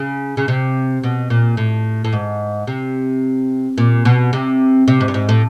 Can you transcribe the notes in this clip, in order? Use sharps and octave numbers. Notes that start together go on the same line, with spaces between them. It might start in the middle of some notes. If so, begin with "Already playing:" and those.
Already playing: C#3
C#3
C3
B2
A#2
A2
A2
G#2
C3
A#2
B2
C3
C3
G#2
G2
G#2
A2